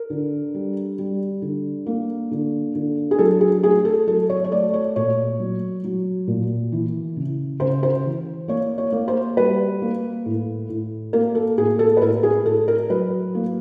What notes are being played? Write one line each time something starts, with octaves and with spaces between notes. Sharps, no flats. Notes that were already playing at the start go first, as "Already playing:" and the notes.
Already playing: A#4
D3
G3
G3
D3
A#3
D3
D3
G#4
F#3 A4
G#4
A3 G#4
A4
F#3 A4
C#5
C#5
A3 D5
C#5
A#2 C#5
F#3
F#3
A#2
E3
C#3
C#3 C5
C5
E3
A#3 C#5
C#5
A#3
C5
G3 B4
A#3
A2
A2
A#3 A#4
A4
A2 G#4
A4
B4
A2 A#4
G#4
A2 A4
A#4
F#3 B4
A#3